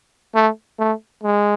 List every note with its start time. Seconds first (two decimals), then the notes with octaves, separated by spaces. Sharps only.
0.35 A3
0.79 A3
1.23 G#3